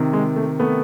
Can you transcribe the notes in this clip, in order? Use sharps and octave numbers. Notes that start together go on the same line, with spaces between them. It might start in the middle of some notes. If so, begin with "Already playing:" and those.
Already playing: C3 D#3
G#3
A3
A3 B3